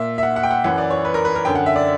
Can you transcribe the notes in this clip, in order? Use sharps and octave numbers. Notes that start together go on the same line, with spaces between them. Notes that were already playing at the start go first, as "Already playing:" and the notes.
Already playing: A#2 E5
E5
F#5
F#5
G5
F#5
F#2 E3 F#5
D5
C#5
B4
A#4
B4
A#4
F#2 D3 G5
F#5
E5
D5